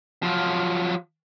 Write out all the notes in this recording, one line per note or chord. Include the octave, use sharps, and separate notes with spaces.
F3 F#3